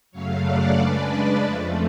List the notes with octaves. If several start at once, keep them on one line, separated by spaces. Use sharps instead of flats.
F#2 C#3 F#3 A3 C#5 F5
D5 F#5
C#3 G#3 D4 B4 D5
F2 F3 A3